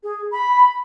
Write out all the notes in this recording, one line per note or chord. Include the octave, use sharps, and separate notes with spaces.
G#4
B5